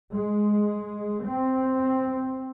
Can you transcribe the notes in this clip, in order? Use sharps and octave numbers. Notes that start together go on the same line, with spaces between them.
G#3
C4